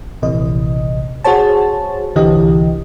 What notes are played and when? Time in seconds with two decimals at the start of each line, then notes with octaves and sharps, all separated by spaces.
0.22 A#1 C3 E3 D#5
1.24 F#4 G#4 C5 C#5 A5
2.15 C2 D3 E3 G4 D#5